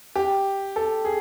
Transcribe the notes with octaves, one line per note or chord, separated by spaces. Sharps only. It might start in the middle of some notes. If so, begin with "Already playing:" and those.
G4
A4
G#4